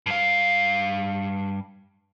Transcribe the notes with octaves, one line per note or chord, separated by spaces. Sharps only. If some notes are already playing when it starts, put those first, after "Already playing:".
G2 F5